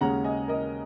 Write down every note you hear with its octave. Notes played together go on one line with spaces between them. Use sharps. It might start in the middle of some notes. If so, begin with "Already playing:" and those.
D#2 C#3 G#3 C#4 F#5 A#5
D#5 G#5
A#4 D#5